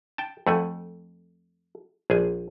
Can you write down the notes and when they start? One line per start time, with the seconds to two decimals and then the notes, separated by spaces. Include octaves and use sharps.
0.18 G5 A5
0.47 F2 A3 F#5 G#5
2.10 A#1 G#4 G#5